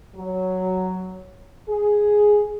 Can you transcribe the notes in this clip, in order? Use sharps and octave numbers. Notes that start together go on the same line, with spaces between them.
F#3
G#4